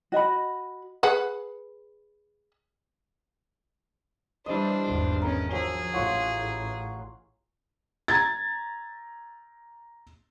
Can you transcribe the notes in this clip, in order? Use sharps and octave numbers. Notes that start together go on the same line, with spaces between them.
F#4 D#5 G#5 B5
G#4 B4 F#5
E3 G3 D4 C5 D#5
G#1 E2 G2
B3 C#4 A#4
F3 F#3 G#4 E6
A1 F4 C#5 F#5
A#5 G#6 A6